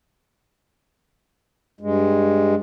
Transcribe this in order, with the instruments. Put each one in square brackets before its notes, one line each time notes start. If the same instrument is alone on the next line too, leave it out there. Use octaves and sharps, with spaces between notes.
[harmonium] G2 G#3